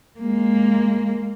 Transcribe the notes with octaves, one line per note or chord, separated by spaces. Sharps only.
G#3 A#3